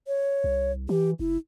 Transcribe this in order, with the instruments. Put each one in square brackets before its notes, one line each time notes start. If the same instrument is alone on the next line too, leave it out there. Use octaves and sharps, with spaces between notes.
[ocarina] C#5
[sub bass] C2
[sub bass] E3 [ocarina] G4
[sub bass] F#1 [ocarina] E4